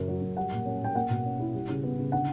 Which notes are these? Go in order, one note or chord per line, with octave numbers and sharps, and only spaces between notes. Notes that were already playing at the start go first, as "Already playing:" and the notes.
Already playing: F#2 C#3
F#3
F#2
G3 F#5
A#2
C#4
A#2 G5
A#3 F#5
B2
C#4
E4
G3
C#3
B3
C#3
D3 F#5